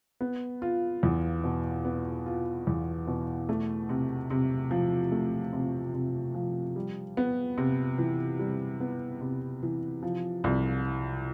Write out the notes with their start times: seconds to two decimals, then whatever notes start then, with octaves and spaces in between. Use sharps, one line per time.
0.21 B3
0.62 F4
1.03 E2
1.44 B2
1.85 B3
2.26 F4
2.67 E2
3.07 B2
3.49 A3
3.89 C3
4.30 C3
4.71 F3
5.12 A3
5.53 C3
5.94 C3
6.34 F3
6.76 G3
7.17 B3
7.58 C3
7.98 E3
8.39 G3
8.80 B3
9.21 C3
9.63 E3
10.03 F3
10.44 C2